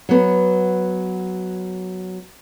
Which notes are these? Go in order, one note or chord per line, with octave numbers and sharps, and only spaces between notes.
F#3 B3